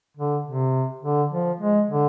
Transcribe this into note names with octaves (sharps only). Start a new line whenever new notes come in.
D3
C3
D3
F3
G#3
D3